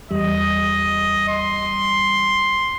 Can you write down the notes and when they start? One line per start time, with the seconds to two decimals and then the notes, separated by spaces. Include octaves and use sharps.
0.11 E2 G3 D#5
1.29 C6